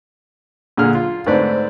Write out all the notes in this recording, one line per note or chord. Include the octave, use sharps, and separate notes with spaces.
A#2 D3 G#4 F6
F4
G#2 D3 A3 C4 B4 D5